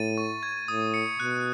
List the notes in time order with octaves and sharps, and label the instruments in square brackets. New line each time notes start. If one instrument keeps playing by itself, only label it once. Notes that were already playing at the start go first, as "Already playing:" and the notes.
Already playing: [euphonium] A2 [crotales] A6 D#7
[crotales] C#6
G#6
[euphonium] A2 [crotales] D#6
[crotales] C#7
[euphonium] B2 [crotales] F#6